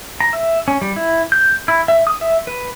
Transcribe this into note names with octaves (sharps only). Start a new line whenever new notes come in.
A#5
E5
C#4
G3
E4
G6
E4
E5
D#6
E5
B4